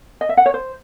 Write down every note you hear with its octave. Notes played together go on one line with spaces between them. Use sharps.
D#5
E5
F#5
C#5
C5